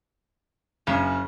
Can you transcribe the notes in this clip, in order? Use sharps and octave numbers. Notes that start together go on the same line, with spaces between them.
F#1 F#2 C#3 B6